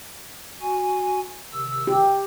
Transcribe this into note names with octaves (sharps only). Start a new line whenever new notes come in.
F#4 G#5
C3 D#3 E6
G4